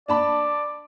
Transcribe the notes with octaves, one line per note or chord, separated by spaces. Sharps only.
D4 D5 A5 B5